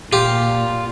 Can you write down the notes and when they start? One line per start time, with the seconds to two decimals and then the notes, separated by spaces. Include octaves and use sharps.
0.13 A#2 F4 G4